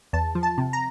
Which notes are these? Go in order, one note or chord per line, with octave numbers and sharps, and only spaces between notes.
E2 A5
F3
A5
C3
A#5